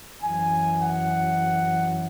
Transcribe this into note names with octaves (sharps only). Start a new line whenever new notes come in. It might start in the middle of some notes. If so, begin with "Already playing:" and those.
F#2 E3 G#5
F#5